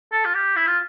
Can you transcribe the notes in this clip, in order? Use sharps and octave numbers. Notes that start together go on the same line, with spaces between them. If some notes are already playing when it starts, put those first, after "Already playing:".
A4
F4
G4
E4
F4